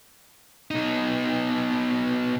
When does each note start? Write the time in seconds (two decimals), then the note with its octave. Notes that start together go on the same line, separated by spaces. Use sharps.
0.71 B2 D#4